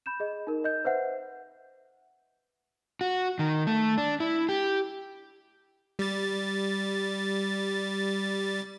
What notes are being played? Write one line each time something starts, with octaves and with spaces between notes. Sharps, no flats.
B5 G6 E7
G#4 D#5
D#4 A#4
D#5 G6
B4 C5 E5 F#5
F#4
D#3
A3
D4
E4
G4
G3 A6